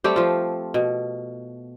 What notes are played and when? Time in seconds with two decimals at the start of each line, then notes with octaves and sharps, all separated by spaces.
0.04 G3 A3 C4 G4
0.16 F3 F4
0.74 B2